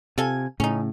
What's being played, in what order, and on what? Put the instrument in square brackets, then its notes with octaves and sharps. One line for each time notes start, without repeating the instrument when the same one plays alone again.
[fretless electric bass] C3 [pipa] F4 A4 G#5
[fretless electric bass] A2 C#3 [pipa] C#4 D#4